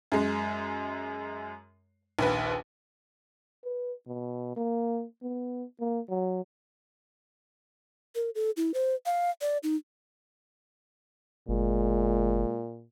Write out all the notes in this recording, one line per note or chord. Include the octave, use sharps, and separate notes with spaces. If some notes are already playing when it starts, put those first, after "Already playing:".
F#2 G#3
A#1 D#2 B4
B4
B2
A#3
B3
A#3
F#3
A#4
A4
E4
C5
F5
D5
D#4
G1 A#2 G#3